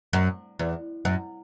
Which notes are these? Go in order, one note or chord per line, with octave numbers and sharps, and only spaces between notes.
F#2
E2
F#2